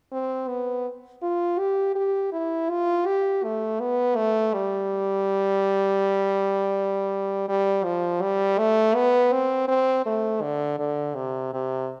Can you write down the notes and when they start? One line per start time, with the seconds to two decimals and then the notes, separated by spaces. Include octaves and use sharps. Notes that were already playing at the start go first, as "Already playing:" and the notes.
0.12 C4
0.48 B3
1.22 F4
1.58 G4
1.95 G4
2.32 E4
2.70 F4
3.06 G4
3.43 A3
3.80 B3
4.16 A3
4.53 G3
7.48 G3
7.84 F3
8.22 G3
8.58 A3
8.95 B3
9.32 C4
9.68 C4
10.06 A3
10.42 D3
10.78 D3
11.15 C3
11.53 C3